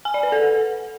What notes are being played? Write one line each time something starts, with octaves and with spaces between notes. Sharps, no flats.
G#5
D5
B4
A4